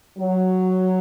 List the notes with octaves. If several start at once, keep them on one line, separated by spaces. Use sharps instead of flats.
F#3